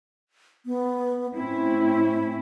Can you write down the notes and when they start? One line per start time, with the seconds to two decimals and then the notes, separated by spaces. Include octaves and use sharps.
0.66 B3
1.34 A2 C4 C#4 E4